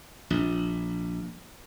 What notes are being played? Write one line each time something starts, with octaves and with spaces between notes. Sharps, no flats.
A#1